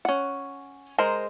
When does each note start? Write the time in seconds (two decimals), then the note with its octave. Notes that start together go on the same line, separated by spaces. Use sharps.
0.05 C#4 F#5
0.98 G#3 A#4 C5 A#5